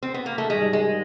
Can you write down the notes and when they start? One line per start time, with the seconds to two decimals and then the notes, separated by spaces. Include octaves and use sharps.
0.03 C4
0.14 B3
0.26 A#3
0.38 A3
0.50 G#2 D#3 G3 G#3
0.73 G#3